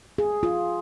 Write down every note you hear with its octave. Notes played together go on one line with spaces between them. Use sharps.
G#4
F4